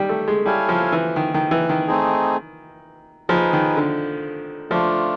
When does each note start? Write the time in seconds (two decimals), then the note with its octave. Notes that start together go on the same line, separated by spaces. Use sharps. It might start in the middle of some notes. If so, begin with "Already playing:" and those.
Already playing: D#3 G3
0.09 A3
0.28 G#3
0.45 G3 E4 A4 C#5 F5 G#5
0.69 F3
0.92 E3
1.16 D#3
1.34 D#3
1.51 E3
1.69 D#3
1.87 A3 C4 D#4 G#4
3.29 F3 D#4 G#4 B4
3.53 D#3
3.77 D3
4.70 F3 A3 D4 F4